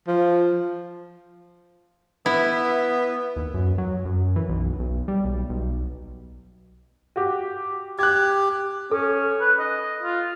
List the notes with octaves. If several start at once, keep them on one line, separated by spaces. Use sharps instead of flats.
F3
B3 E4
D#2
F#2
F#3
F#2
E3
B1
B1
G3
B1
B1
F#4 G4
G4 F#6 G#6
C#4 A4
B4
D#5
F4